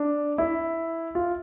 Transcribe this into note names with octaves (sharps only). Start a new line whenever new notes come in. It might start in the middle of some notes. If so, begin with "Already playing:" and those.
Already playing: D4
E4
F4